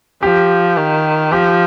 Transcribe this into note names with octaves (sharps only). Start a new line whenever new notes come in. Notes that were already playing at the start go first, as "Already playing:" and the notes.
F3 G4
D#3
F3 G4